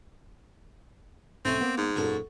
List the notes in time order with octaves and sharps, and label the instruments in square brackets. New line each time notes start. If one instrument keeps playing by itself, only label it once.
[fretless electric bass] B1 G#2 [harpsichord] A3 C#4 [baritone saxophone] C4
[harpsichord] A#3 [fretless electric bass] B3
[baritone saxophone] G#2
[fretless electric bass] E1 F#2 A#2 [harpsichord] F#4 A4